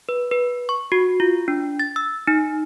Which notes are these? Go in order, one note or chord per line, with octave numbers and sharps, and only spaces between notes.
B4
B4
C#6
F#4
F4
D4
A6
E6
D#4